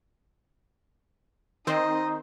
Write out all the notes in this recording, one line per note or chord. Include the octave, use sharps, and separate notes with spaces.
D#3 C4 D#4 C5 D#5